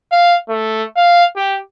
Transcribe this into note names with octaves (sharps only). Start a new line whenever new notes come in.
F5
A3
F5
G4